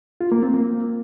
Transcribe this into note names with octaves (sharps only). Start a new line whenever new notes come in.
F4
A#3
C4
A#3